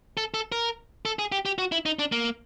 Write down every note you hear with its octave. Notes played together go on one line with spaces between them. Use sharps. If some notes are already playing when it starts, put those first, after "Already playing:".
A4
A4
A#4
A4
G#4
G4
G4
F#4
E4
D#4
D4
A#3